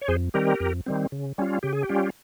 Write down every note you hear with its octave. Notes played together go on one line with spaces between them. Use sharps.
C#5
F2 G#4 C5
D#3 G3 C4 G4 A#4
F2
D#3 G3 C4
C#3
G3 C#4 F4
C#3 G4
G#4
G4
G3 C#4 F4